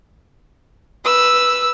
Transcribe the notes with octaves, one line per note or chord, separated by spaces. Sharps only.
B4 E6